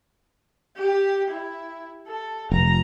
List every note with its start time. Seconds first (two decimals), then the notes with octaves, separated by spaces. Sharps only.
0.77 G4
1.31 E4
2.08 A4
2.52 F1 A#5